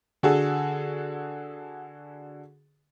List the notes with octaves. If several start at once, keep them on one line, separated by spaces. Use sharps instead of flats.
D3 F#4 G#4 A4